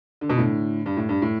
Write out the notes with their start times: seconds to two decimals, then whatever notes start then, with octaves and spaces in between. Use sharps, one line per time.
0.21 D3
0.30 B2
0.37 A2 D3
0.86 G2
0.97 A2
1.09 G2
1.22 A2